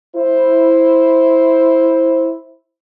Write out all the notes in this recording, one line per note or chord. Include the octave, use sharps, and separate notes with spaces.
E4 C5